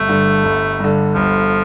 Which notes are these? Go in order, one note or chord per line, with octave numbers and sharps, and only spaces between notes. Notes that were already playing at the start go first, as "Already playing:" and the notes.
Already playing: G1 A3
G2 D3
G1
G2 D3
G1 F3